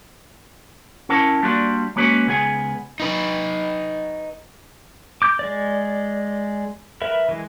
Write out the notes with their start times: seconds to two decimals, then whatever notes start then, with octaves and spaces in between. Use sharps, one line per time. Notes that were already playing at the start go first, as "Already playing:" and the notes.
1.09 C#4 E4 A#4 F#5 A5
1.43 G3 A#3 D4 F4 F#4
1.96 G#3 A#3 C#4 F#4 B4
2.28 C#2 B3 G#4 G#5
3.00 D#4 B4
5.22 D6 G6
5.39 G#3 D5
7.02 A#4 B4 E5
7.29 E3 G#3